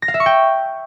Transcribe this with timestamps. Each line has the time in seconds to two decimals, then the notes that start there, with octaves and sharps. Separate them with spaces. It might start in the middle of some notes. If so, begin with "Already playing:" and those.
0.02 A#6
0.08 F5
0.14 E5
0.20 C#6
0.26 G5